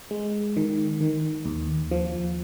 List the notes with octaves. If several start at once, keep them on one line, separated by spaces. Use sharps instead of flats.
G#3
D#3
D#3
D#2
F3